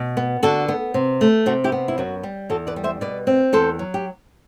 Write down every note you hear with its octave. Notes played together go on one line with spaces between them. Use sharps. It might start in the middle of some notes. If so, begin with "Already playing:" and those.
Already playing: B2
B3
D3 F#4 A4
B3
C3
A3
C3 F#4 A4
E4 G4
B3
E4
F#2 F#4
G3
E2 F#4 A4
B4 D5
G3
C5 E5
B2 B4 D5
C4
E2 A4 C5
F#3
G4